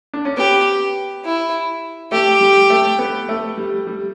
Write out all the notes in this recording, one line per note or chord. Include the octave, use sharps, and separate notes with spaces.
D4
C#4
B3 G4
E4
A3 G4
G3
A3
B3
A3
G3
G3